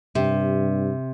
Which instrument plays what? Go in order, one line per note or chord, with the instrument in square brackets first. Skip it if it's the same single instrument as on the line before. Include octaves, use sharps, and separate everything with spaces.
[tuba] G2 [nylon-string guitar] C3